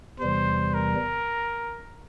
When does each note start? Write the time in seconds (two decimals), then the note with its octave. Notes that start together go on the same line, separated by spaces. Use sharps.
0.20 E2 C3 E3 G3 C5
0.74 A#4